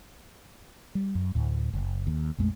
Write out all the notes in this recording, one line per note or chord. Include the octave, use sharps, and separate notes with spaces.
G3
F#2
D2 A2
F#1
D#2
A#1 F2 G#3 A3